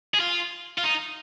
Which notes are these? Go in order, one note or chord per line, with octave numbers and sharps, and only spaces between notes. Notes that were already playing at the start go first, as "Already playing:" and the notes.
G#4
F4
F4
D#4